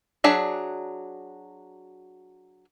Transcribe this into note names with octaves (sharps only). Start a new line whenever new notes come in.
F#3 D4 G#4 E5 F#5